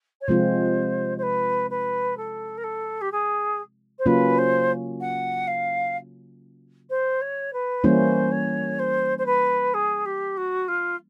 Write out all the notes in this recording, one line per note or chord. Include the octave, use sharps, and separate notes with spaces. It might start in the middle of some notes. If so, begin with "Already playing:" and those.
C#5
C3 F3 G#3 C4 F4 C5
C5
B4
B4
A4
A#4
A4
G4
G#4
C5
C#3 F#3 A#3 C#4 F4 B4
C5
F#5
F5
C5
C#5
B4
E3 G3 A#3 C#4 E4 C5
C#5
C5
C5
B4
G#4
G4
F#4
F4